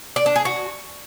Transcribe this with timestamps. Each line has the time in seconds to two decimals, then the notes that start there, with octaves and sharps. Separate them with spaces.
0.16 D5
0.26 D4
0.36 G#4
0.45 F#4